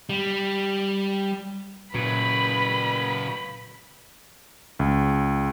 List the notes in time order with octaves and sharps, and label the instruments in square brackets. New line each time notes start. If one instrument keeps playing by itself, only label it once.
[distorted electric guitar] G3
[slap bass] A#2 [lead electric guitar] C#3 F#3 [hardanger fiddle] B4 [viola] B5
[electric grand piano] C#2